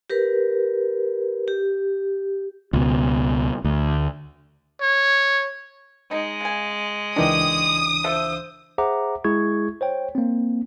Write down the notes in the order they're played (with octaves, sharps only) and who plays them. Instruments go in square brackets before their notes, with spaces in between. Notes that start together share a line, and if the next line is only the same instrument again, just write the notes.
[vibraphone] G4 A#4 B4
G4
[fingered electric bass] C#2 B2
D2
[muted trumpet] C#5
[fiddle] G#3 [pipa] D#4
[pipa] C#3 G#5
[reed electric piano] C#2 E3 D4 [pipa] D#3 G4 [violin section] D#6
[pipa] F3 A4 E5 [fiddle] C5
[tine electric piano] G#4 C5 E5 F#5 A#5 D6
G#3 E4 G#4 C#6 G#6
C5 C#5 G5
A#3 C4